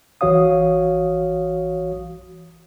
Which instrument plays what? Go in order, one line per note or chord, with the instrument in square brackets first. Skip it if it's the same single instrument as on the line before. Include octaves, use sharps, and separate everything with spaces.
[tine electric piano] A#1 E3 F#4 C#5 F5 D#6